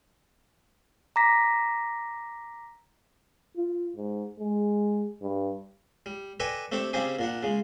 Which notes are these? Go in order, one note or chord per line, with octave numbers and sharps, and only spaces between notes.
A#5 D6 A#6 B6
F4
G#2
G#3
G2
G3
A4 B4 D5 D#5 G5 G#5
A3 C4 D4 G4 A4
C#3 G3 C4 D4 G4 G#4
A#2 D4 F#5
C#3 G#3